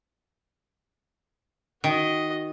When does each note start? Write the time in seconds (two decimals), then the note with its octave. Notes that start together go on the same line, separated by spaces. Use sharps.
1.84 D#3 F#4 D#5